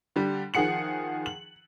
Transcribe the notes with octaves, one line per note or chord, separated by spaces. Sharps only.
D3 G3
D#3 F3 G#4 F#5 C#7 F#7
F#7